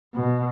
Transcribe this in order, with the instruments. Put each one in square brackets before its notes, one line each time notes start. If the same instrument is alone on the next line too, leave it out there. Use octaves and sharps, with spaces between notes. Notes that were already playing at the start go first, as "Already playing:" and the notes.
[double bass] B2